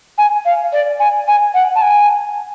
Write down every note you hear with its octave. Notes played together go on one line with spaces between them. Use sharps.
G#5
F5
D5
G#5
G#5
F#5
A5
G#5